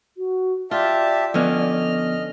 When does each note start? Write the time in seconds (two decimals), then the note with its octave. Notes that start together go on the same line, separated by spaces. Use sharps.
0.17 F#4
0.71 F4 G4 D5 E5 A5
1.34 D3 F3 B3 C#4 D#5 F6